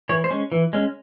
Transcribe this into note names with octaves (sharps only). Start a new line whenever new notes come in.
E3 C#5
C5
G#3 C#4
E3
G#3 C#4